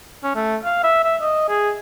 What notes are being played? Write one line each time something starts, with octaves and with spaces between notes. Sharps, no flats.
C#4
A3
F5
E5
E5
D#5
G#4